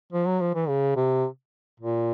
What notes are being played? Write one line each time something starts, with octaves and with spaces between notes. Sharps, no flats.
F3
F#3
F3
E3
C#3
C3
A#2